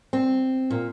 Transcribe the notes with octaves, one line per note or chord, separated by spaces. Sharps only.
C4
A#2